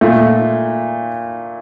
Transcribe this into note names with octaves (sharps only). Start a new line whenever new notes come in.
A#2 A3